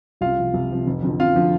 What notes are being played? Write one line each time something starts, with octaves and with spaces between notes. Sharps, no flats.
C2 F4 F5
C3 F3
C2
C3 F3
F1
F2 D3 F3
F1 F4 F5
D3 F3